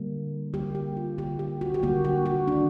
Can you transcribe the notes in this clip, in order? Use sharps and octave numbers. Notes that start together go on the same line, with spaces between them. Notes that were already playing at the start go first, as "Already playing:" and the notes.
Already playing: D3 G3 A#3
D3 G3 A#3 G4
G4
F4
D3 G3 A#3 G4
G4
F#4
G4
D3 G3 A#3 F#4
F#4
F#4
D#3 G#3 D4